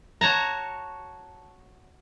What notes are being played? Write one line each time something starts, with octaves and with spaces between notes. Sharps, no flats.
F#4 C#5 A5 A#5